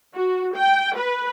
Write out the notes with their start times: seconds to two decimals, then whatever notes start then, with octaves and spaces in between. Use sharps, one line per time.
0.14 F#4
0.55 G5
0.96 B4